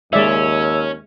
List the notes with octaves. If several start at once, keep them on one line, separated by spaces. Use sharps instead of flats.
D#2 G#3 C#4 D5 E5 E6